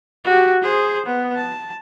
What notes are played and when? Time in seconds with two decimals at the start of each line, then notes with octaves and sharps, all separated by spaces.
0.24 F#4 G4
0.62 G#4 C5
1.06 B3
1.36 A5